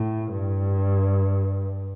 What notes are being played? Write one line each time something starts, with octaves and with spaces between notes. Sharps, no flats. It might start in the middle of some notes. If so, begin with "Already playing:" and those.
Already playing: A2
G2